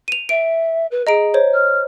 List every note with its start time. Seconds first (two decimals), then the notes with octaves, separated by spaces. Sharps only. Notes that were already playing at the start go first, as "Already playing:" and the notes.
0.08 D#7 F7
0.29 E5 D7
0.91 B4
1.07 G#4 D#5 A#5 D7
1.34 C5 C#5
1.53 F6